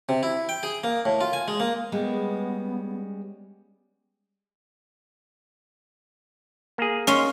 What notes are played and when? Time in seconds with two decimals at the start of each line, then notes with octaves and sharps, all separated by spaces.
0.09 C3
0.23 E4
0.49 G5
0.63 G#4
0.84 A#3
1.05 A2
1.21 F4
1.33 G#5
1.48 G#3
1.60 A#3
1.92 G3 G#3 B3 C#4
6.78 A#3 G#4
7.07 C#4 F5 C6